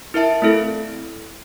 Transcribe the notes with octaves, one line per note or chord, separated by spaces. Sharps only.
E4 A#4 E5 A5
A3 C4 E4 A4